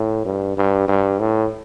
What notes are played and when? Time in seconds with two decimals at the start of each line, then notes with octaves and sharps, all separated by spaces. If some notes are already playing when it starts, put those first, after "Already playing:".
Already playing: A2
0.25 G2
0.57 G2
0.88 G2
1.20 A2